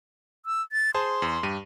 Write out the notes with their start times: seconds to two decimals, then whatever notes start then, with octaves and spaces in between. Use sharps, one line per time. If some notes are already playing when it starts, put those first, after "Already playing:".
0.46 E6
0.72 A6
0.94 G#4 C5 A5 C6
1.22 E2
1.43 G2 G4 D#7